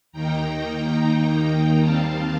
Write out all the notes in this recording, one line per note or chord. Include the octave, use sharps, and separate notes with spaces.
D#2 D#3 A#3 D#4 G5 A#5
D#2 D#3 G3 C4 F5 A5